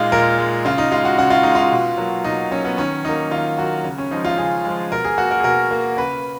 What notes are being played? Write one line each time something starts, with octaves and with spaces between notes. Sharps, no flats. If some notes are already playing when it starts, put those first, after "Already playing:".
Already playing: A#2 G#3 D#4 F4
A#2 A#4
G#3
C#3 F4
D#4
G#3 F4
F#4
C#3 F#4
F4
G#3 D#4
F4
B2
F#3 A#3
B2 D#4
F#3 A#3 C#4
B3
D#3 C#4
F#3 A#3 D#4
D#3 F4
F#3 A#3 F#4
C#3
C#4
F3 G#3 D#4
F4
C#3 G#4
F3 G#3
B2 A#4
G#4
A#3 F#4
A#4
G#4
B2 A#4
A#3
C#3 B4